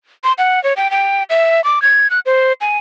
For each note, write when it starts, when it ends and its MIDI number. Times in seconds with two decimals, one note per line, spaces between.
0.24 0.33 84
0.38 0.62 78
0.64 0.73 73
0.77 0.90 79
0.91 1.23 79
1.30 1.64 76
1.64 1.82 86
1.82 2.08 92
2.10 2.20 90
2.26 2.53 72
2.61 2.78 80